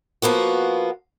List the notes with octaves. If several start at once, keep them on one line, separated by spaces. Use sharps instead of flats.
F3 A#3 B3 F#4